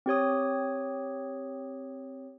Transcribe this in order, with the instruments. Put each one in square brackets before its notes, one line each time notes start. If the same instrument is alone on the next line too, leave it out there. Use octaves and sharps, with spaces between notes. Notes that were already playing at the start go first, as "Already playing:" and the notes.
[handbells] C4 G4 C#5 D#6